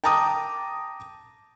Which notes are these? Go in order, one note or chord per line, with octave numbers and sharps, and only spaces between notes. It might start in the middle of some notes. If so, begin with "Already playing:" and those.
G5 A5 A#5 D6 D#6